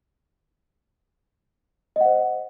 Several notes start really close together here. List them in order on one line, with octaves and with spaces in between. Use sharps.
D#5 F#5 C5